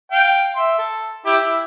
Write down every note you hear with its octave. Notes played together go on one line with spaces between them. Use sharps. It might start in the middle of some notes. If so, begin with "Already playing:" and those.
F5 G5
E5 C6
A4
E4 G4
E4